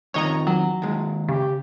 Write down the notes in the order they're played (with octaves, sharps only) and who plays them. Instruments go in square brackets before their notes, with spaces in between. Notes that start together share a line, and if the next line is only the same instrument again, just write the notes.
[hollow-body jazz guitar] F2 D#3 G3 [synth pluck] C#5 D#5 A#5
[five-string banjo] F#3
[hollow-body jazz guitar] D#2 G#3
[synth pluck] C#3 [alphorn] G4